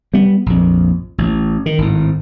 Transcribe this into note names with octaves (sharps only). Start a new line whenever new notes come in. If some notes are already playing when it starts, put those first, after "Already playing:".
G3 B3
A#1 F2
A1
D#3
G#1 A2